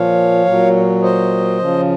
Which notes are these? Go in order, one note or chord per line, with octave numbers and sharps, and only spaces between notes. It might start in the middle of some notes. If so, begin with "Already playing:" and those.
Already playing: A#2 F3 C#5 F5
A#2 F#3
C5 D#5
C#3 F3